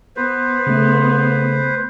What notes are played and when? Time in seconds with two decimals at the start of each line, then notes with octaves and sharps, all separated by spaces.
0.16 B3 B4 C5
0.67 C#3 A3